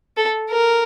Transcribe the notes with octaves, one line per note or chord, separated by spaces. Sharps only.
A4
A#4